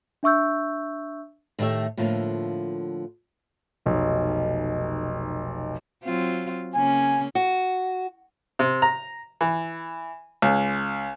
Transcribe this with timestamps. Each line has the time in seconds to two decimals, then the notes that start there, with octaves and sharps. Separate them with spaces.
0.23 D4 E5 C#6 E6 G6
1.59 A2 D#3 A3 G4 E5
1.97 A2 D3 F3 A#3 F4
3.86 F1 B1
6.04 F#3 C4 F4
6.75 C#3 A#3 C#4 G#5
7.35 F#4
8.59 C3
8.82 A#5
9.41 E3
10.42 C#2